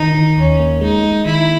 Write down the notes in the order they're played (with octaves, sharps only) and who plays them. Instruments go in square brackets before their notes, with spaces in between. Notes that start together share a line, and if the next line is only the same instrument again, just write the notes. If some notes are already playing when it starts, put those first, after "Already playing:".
Already playing: [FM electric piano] D#3 A#4 [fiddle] D#4
[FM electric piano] D#3
[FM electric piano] D#2 [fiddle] C#4
[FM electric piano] A#3
[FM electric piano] G#3 [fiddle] D#4
[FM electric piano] G#3
[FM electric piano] D#3 [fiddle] E4